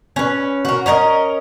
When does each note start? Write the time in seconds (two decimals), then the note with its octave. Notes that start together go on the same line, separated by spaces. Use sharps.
0.16 C#4 B4
0.65 F#4 A#4
0.86 C#4 A#4 C#5 D#5